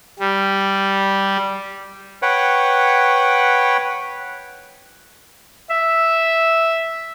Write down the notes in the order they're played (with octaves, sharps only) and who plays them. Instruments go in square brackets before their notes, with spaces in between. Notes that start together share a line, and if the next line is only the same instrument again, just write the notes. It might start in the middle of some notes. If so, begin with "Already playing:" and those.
[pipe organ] G3
[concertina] B4 C#5 F#5 G5
[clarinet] E5